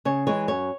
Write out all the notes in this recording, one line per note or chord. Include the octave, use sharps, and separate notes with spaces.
C#3 C#5
E3 G#3 C#5
F#2 C#5